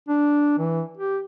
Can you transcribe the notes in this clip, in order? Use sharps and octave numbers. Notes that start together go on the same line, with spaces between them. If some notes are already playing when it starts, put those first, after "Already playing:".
D4
E3
G4